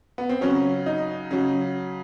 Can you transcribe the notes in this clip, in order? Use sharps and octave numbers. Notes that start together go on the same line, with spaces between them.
B3
C4
C#3 F#3 C#4
D#4
C#3 F#3